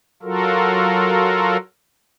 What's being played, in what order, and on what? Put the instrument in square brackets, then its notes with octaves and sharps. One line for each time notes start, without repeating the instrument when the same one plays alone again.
[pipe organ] F#3 F4 F#4 A4 A#4